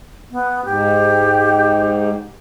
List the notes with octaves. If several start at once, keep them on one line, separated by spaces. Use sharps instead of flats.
B3
G#2 G4